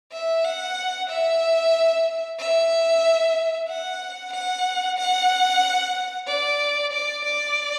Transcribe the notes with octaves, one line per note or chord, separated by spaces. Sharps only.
E5
F#5
E5
E5
F#5
F#5
F#5
D5
D5
D5